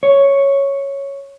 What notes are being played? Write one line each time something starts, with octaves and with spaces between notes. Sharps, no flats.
C#5